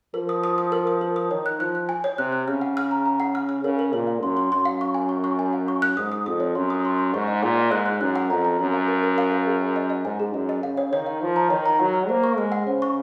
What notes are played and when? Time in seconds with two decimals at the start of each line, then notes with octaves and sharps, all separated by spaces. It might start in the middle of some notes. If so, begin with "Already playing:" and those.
0.14 F3 A#4
0.29 D#6
0.44 D#6
0.58 D#6
0.72 A#4
0.87 D#6
1.01 A#4
1.16 D#6
1.31 D#3 C#5
1.46 F#6
1.60 F3 F#6
1.75 F#6
1.89 G#5
2.04 C#5
2.18 C3 F#6
2.32 F#6
2.47 C#3 F6
2.61 F#5
2.77 F6
2.91 A#5
3.06 A#5
3.20 F#5
3.35 F6
3.49 F6
3.64 C#3 A#4
3.79 A#4
3.93 A#2 A#4
4.07 F5
4.22 F#2 C6
4.37 C6
4.52 F#2 C6
4.65 F5
4.81 C#6
4.94 G#5
5.09 C#6
5.24 C#6
5.39 G#5
5.53 F5
5.68 C#6
5.82 F#6
5.97 G#2 D#6
6.12 D#6
6.26 F2 D#6
6.40 C#5
6.55 F#2 C6
6.70 D#6
6.85 C6
6.98 C6
7.14 G#2 C#6
7.27 D#5
7.43 A#2 F#5
7.58 D#5
7.71 G#2 F#6
7.86 F#6
8.01 F#2 F#6
8.16 F#5
8.30 F2 A#5
8.45 A#5
8.59 F#2 A#4
8.73 F5
8.88 A#4
9.03 A#4
9.18 F5
9.32 A#4
9.47 G#4
9.61 G#5
9.76 D#5
9.90 D#5
10.05 G#2 G#5
10.20 G#4
10.33 F#2 D#5
10.49 D#5
10.63 C#3 F5
10.77 C#5
10.92 D#3 C#5
11.06 F5
11.21 F3 C#5
11.36 A#5
11.50 D#3 C#5
11.66 A#5
11.79 F#3 F#5
11.94 F6
12.09 A#3 C5
12.24 C#6
12.37 G#3 F6
12.52 F#5
12.67 C#3 C5
12.82 C#6